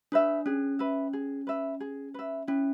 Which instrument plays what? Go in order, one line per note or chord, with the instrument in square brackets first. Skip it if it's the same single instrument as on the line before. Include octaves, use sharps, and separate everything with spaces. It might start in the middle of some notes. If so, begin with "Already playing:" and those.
[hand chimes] D4 [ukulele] B4 E5
[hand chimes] C#4 [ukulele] G#4
[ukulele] B4 E5
G#4
B4 E5
G#4
B4 E5
[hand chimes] C#4 [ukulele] E4